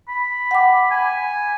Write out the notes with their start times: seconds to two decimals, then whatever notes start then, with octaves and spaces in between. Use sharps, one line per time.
0.08 B5
0.51 F#5 G5 D6
0.91 G#5